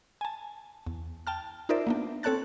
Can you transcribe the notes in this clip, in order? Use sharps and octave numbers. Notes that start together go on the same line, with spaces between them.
G#5 A5
E2
G5 A5 F6
D#4 F4 A#4 C5 D5 E5
A#3 B3 D4
C4 A4 C#5 A5 F#6 A6